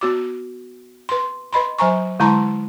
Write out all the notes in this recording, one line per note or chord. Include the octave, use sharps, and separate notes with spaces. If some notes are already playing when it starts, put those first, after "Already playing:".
B3 F#4 D6
B4 C6
B4 D#5 B5 C6
F#3 C5 G#5 A#5 C#6
D3 G#3 E4 A5 A#5 C6